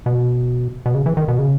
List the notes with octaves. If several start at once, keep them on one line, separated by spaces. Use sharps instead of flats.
B2
B2
C#3
E3
D#3
B2
C#3